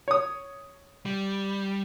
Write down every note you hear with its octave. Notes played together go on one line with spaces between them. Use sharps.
C#5 D#6
G3